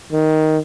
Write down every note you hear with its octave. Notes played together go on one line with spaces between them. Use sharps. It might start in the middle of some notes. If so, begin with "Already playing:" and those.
D#3